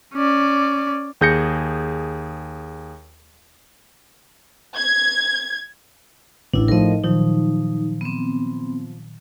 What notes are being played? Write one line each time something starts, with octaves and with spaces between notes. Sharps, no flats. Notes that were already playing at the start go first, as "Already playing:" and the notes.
C#4 D5
D#2 G#4 G6 A#6 C#7
G#6
A1 D4 E4
A2 F3 D#4 A#4 D#5
A#2 D#3 F3 F#3 D#4
B3 C4